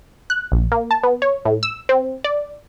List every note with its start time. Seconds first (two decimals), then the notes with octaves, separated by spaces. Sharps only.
0.30 F#6
0.52 A#1
0.72 A#3
0.91 A5
1.03 B3
1.22 C#5
1.45 A2
1.63 E6
1.89 C4
2.24 D5